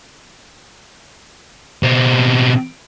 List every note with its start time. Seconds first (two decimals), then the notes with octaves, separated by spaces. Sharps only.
1.83 B2 C4